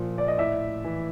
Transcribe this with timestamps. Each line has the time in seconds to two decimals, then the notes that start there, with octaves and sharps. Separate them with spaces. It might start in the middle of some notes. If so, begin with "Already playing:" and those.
Already playing: A#2 F3
0.18 D5
0.28 D#5
0.38 A2 D5 E5
0.84 E3